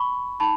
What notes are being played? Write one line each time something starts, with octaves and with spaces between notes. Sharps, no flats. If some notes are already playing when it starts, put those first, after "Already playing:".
Already playing: B5 C#6
D#4 A5 B5